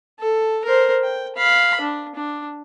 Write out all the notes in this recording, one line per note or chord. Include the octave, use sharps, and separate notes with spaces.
A4
A#4 C5
G5
F5 B5
D4
D4